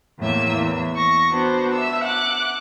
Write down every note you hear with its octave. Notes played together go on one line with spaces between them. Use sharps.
E2 A2 A#3 E5 E6
E2
C#6 A#6
B3 D4 F#4 C5
E5 E6
F#5 D6 F#6